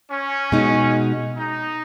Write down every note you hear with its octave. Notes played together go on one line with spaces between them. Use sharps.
C#4
B2 G#3 D#4
D#4